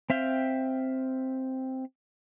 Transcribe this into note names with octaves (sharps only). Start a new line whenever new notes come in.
C4 E5 F5 G5